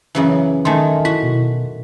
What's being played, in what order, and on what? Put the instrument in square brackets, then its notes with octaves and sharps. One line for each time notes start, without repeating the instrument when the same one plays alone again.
[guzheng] F#2 C#3 E3
[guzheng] D#3 A3 [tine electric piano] G#5 A5 C6
[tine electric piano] E4 B6 [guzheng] F#4
[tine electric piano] B2